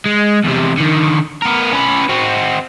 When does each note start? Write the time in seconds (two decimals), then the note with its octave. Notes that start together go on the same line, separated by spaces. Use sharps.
0.06 G#3
0.44 E2 C3
0.77 D3 D#3
1.42 B3 A#4
1.73 C#4 B4
2.09 C4 F#4